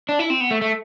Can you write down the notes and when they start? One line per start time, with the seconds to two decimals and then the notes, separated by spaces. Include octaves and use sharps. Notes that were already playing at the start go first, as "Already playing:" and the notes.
0.09 D4
0.19 E4
0.30 C4
0.41 B3
0.51 A3
0.61 A3